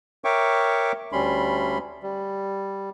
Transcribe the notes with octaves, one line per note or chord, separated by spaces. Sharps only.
A#4 C#5 E5 G5 C#6 D6
D2 G3 C#4 B5 C6
G3